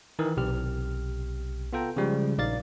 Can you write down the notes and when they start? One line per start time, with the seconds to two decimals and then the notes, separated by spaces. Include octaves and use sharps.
0.19 D#3 E3 A#4
0.37 B1 C3 G4 F6
1.73 B3 F4 A4 G5 A#5
1.96 C#3 F3 G3 G#3
2.38 A#1 D#4 D5 F5 A6